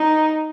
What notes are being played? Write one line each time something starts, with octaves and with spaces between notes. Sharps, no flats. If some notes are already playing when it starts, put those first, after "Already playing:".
Already playing: D#4